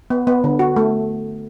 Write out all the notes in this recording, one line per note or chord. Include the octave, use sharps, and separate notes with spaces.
B3
B3
D3
F#4
A3